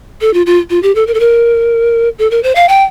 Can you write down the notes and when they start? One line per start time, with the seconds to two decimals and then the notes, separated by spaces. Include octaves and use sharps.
0.21 A4
0.34 F4
0.46 F4
0.70 F4
0.83 G4
0.95 A4
1.07 A#4
1.14 A4
1.20 A#4
2.19 A4
2.31 A#4
2.43 C5
2.55 F5
2.69 G5